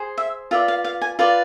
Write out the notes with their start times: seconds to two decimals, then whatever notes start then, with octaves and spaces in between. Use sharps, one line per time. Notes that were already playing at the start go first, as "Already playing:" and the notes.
Already playing: G#4 C5
0.18 E5
0.51 F4 B4 D5 E5
0.68 F5
0.84 F5
1.02 G#5
1.19 F4 B4 D5